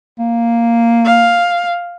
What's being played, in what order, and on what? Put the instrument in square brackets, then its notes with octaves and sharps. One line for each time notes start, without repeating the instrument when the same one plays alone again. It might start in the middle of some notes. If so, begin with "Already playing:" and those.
[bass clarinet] A#3
[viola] F5